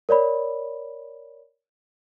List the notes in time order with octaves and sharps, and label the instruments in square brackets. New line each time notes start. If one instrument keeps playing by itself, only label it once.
[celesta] A#4 C#5 D5 B5